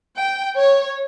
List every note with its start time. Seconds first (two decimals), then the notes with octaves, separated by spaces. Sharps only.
0.16 G5
0.55 C#5